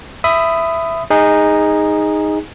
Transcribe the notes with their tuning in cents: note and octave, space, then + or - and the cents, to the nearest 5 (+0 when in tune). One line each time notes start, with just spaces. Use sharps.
E5 +5 B5 +25 D#6 +0
D#4 +0 G#4 -20